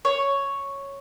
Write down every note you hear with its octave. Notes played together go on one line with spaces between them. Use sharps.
C#5